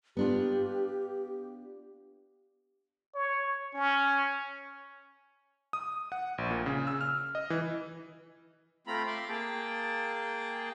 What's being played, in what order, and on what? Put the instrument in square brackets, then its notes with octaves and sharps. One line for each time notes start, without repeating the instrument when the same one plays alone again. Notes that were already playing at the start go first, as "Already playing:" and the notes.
[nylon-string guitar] B3 D4 F4 [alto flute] G4
[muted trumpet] C#5
C#4
[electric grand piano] D#6
F#5
A#1
A#2
C#3
E6
F6
D#5
E3
[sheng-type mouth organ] A3 C4 F4 A#5 B5
E5 C6 D6
A#3 G#4 G5 A5